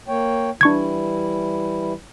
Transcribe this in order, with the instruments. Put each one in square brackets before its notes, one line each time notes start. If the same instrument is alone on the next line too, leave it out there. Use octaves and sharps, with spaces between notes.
[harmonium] A#3 C#5 G5
[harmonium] E3 G3 E4 [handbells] D4 C#6 G#6